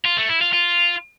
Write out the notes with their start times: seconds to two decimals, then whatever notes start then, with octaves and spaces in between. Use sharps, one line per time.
0.05 F4
0.17 A3
0.29 E4
0.41 F4
0.53 F4